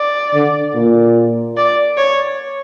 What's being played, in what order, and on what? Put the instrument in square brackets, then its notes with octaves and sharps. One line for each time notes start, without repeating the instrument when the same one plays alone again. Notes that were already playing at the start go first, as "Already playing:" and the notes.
Already playing: [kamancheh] D5
[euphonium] D3
A#2
[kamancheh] D5
C#5